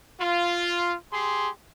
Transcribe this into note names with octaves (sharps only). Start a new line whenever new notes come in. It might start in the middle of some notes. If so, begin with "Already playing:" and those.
F4
G4 G#4 C6